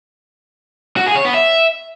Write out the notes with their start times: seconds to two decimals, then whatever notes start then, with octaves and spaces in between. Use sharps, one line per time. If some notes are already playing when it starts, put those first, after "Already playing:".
0.97 F#4
1.06 G#4
1.16 C#5
1.25 B3
1.34 E5